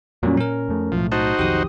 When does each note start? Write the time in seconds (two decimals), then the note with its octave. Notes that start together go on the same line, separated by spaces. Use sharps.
0.23 F2 A#2 F#3 G3 C#4
0.37 A#2 C#4 A#4
0.69 F2 A3
0.92 B1 A2 F3
1.12 D#4 F#4 C5 A5
1.39 B1 F2 D#3 G4 D#6